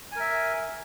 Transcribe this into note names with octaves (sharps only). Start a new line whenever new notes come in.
A#4 E5 G#5